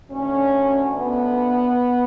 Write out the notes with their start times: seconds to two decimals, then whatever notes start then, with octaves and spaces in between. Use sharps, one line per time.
0.10 D2 D3 C#4
0.95 B3